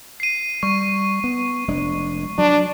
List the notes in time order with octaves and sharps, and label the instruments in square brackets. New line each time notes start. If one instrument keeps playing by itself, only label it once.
[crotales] C7 D#7
[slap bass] G3 [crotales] C#6
[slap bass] B3
F1 G#3 D4
[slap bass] F#3 [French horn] D4